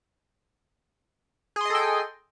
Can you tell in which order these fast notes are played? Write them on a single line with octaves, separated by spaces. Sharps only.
G#4 C6 D#5 A4 G5